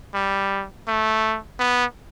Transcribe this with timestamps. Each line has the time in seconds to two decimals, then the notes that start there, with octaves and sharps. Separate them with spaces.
0.14 G3
0.87 A3
1.59 B3